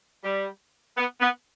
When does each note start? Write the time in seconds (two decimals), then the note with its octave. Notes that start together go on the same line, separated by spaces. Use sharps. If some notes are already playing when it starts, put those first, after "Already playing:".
0.24 G3
0.97 B3
1.21 B3